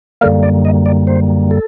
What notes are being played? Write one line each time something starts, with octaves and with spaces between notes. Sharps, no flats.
F#2 D3 G3 A#3 A#4
D5
D#5
D5
C5
A4